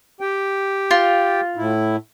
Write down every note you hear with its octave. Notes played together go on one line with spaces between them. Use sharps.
G4 G5
F4
A2 E4